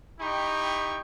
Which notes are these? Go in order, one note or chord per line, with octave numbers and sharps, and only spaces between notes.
D#4 E4 G4 G5 B5 C#6